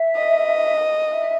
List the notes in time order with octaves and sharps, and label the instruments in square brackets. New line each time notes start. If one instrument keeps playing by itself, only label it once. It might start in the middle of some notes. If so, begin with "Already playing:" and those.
Already playing: [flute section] E5
[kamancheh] D#5
[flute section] E5